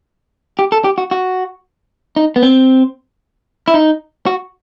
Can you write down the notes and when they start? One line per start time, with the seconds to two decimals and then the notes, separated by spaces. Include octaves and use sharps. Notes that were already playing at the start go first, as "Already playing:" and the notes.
0.59 G4
0.72 A4
0.84 G4
0.98 F#4
1.11 F#4
2.16 D#4
2.36 B3
2.43 C4
3.68 E4
3.74 D#4
4.26 F#4